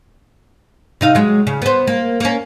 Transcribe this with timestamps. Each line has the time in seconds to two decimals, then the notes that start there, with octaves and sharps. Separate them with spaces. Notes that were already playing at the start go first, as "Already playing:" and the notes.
1.01 C3 D#4 F5
1.15 F#3 G#3
1.47 C#3
1.62 B3 C5
1.87 A#3
2.20 A#3 C#4